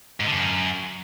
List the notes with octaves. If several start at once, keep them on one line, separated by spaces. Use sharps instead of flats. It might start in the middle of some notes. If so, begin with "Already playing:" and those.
G#2
D3
F#2